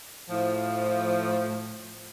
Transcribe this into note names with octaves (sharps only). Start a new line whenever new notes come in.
A2 F3